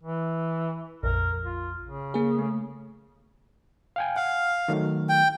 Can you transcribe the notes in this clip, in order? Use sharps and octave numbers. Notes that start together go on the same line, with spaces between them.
E3
A#1 F2 A#4
F4
C#3
A#3 G#4
A3
F5 G5 G#5
F5 F#5
D#3 F#3 A3
G5